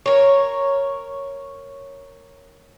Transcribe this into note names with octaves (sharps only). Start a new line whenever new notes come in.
A#4 C#5